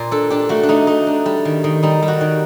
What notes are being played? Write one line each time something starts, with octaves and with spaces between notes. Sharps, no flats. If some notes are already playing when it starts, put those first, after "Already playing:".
Already playing: A#2 C5 D5
D4 A4
D4 G4
A3 F#4
D4
A3 D#4
A3 D#4
D4
G3
D#3
D#3
G3 D#4
G3
F#4
D#3